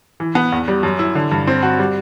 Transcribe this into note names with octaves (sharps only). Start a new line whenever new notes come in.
E3
B3
E2
G3
F#2
E4
D3
G2
C4
F#4
G3